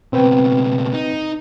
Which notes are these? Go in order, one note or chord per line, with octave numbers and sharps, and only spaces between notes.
C#2 B2 C4 B4 G5
D#4